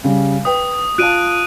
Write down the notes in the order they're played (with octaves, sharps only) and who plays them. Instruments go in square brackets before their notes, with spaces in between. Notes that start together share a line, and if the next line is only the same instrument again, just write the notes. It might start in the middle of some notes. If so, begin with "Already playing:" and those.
[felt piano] C#3 G3
[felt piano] B4 G5 [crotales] D#6
[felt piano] F4 F5 A5 [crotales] F#6 D7 D#7